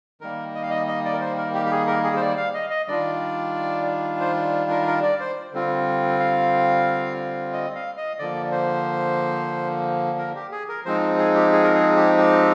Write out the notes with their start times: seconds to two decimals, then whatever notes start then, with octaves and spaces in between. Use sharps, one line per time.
0.21 D#3 G3 A#3 A#4
0.55 D#5
0.63 F5
0.70 D#5
0.88 D#5
1.05 D5
1.13 A#4
1.21 C5
1.37 A#4
1.54 G4
1.66 G4
1.71 G#4
1.87 A#4
2.04 G#4
2.17 C5
2.21 D5
2.37 F5
2.54 D#5
2.70 D#5
2.88 D#3 G3 D4 F4 D5
4.21 C5
4.70 A#4
4.87 A#4
5.03 D5
5.20 C5
5.53 D3 G3 C4 F4
6.20 F5
7.53 D#5
7.75 F5
7.97 D#5
8.19 D3 F3 A#3 D5
8.52 C5
10.18 A#4
10.35 G4
10.52 G#4
10.69 A#4
10.85 F3 G#3 C4 D#4 C5
11.18 G#4
11.35 G4
11.52 G#4
11.64 A#4
11.74 G#4
11.96 G4
12.18 G4